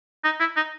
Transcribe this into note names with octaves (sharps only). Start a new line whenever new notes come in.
D#4
E4
D#4